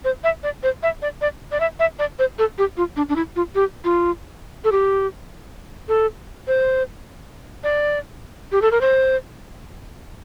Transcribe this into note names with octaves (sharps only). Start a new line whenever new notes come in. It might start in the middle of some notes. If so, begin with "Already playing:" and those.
C5
E5
D5
C5
E5
D5
D5
D5
E5
E5
D5
C5
A4
G4
F4
D4
D4
E4
F4
G4
F4
A4
G4
A4
C5
D5
G4
A4
A#4
C5